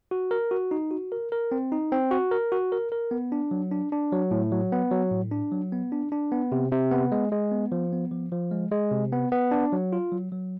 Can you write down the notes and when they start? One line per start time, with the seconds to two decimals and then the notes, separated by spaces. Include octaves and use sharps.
0.11 F#4
0.31 A#4
0.51 F#4
0.71 D#4
0.91 F#4
1.12 A#4
1.32 A#4
1.52 C4
1.72 D#4
1.92 C4
2.11 F#4
2.31 A#4
2.52 F#4
2.72 A#4
2.92 A#4
3.11 B3
3.32 D4
3.51 F#3
3.71 D4
3.92 D4
4.12 F#3
4.31 A2
4.52 F#3
4.72 B3
4.91 F#3
5.11 A2
5.32 D4
5.52 F#3
5.72 B3
5.92 D4
6.12 D4
6.32 B3
6.52 C3
6.71 C3
6.91 B3
7.12 G#3
7.32 G#3
7.52 B3
7.72 F3
7.92 B3
8.11 F3
8.32 F3
8.51 G#3
8.71 G#3
8.91 C3
9.12 B3
9.32 B3
9.51 D4
9.72 F#3
9.93 F4
10.12 F#3
10.32 F#3